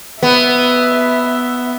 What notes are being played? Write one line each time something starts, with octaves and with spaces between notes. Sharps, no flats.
B3 E5